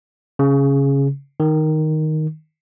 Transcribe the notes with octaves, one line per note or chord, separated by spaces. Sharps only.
C#3
D#3